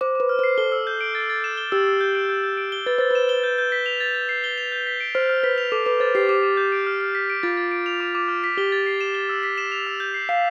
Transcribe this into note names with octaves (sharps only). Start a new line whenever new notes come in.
C5 D6
B4 D6
F6
C5 C7
A4 G7
E6
G6
D7
A6
A6
E7
G7
G4 E6
E6
G6
D7
G6
G6
D7
G7
B4 A6
C5 A6
B4 E7
G7
G6
G6
B6
F7
A6
A6
C7
G7
F7
G6
B6
D7
C5 F6
F6
B4 B6
F7
A4 D6
B4 D6
C5 A6
G4 C7
G4 D6
D6
G6
D7
F6
F6
B6
D7
F4 A6
A6
D7
F7
D6
D6
F6
B6
G4 G7
A6
C7
E7
G7
E6
B6
E7
F7
E6
G6
C7
F5 C7